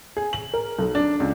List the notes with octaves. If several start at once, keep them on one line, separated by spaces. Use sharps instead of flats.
G#4
F#7
A#4
B1
D4
C#2